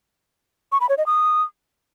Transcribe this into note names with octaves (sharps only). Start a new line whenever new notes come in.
C#6
B5
C#5
D#5
D#6